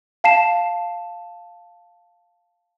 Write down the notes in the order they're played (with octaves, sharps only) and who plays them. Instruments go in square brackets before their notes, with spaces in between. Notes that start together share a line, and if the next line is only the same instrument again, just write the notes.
[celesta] F5 A5 C7 E7